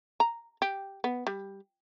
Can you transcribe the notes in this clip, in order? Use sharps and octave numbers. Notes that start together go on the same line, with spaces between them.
A#5
G4
B3
G3